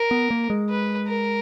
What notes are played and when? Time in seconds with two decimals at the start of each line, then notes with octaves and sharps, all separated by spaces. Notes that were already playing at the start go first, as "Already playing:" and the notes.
Already playing: A#4
0.11 B3
0.31 A#3
0.50 G#3
0.70 B4
1.09 A#4